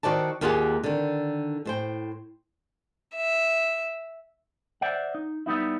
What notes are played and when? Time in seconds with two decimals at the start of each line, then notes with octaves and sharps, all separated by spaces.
0.03 D#3 F#4 C5 D5 A5
0.41 D#2 A#3 F4 G4 G#4 F#5
0.84 D3 D#3
1.65 A2 C5 G5
3.16 E5
4.81 C5 D5 E5 F#5
5.15 D#4
5.46 G3 B3 D#4 E4